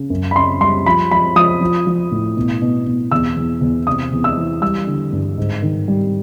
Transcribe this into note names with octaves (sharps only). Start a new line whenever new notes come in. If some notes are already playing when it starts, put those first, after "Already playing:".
Already playing: C#3
F#2
B5
C#3 C6
G3 C6
F3 B5
F3 B5
F3 D#6
F3
F3
A2
B2
B2
B2
E2 E6
E2
E2
C3 D#6
E2
E6
E3
G3 E6
D3
G2
G#2
D#3
G3